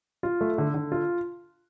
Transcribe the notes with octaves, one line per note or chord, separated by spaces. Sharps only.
F4
A3
D3
D3
F4